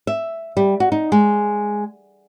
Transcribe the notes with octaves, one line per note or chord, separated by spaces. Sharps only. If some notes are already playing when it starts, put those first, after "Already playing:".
E5
G3
F#4
D#4
G#3